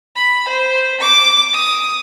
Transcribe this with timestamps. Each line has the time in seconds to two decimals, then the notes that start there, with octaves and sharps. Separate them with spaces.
0.16 B5
0.48 C5
1.00 D6
1.53 D#6